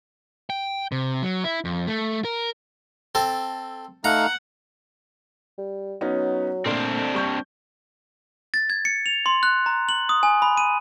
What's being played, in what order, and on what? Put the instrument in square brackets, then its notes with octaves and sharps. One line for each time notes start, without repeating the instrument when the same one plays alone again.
[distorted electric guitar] G5
C3
F#3
E4
F2
A3
A#4
[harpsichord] C4 A4
[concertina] A3 D#4 F5 [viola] F#5 [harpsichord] A#5
[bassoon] G3
[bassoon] F#3 [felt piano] B3 C#4 D#4
[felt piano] A#2 A3 [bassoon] D3 [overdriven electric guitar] C4 D4
[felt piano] G3 C#6 G6
[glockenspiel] A6
G#6
C#7
F7
C6
F#6
A#5
F#7
D#6
G#5
B5
D#7